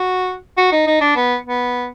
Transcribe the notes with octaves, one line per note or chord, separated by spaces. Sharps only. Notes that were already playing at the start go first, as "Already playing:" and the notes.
Already playing: F#4
F#4
D#4
D#4
D4
B3
B3